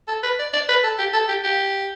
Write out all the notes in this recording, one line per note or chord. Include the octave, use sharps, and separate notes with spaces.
A4
B4
D5
D5
B4
A4
G4
A4
G4
G4